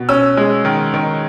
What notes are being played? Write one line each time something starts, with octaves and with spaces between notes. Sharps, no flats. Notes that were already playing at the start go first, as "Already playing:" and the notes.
Already playing: B2
C#4 E6
G#3
D#3
D#3